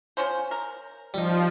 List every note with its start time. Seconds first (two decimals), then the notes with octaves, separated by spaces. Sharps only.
0.17 F3 C#4 C5
0.51 A#4
1.14 F3 G3 D#4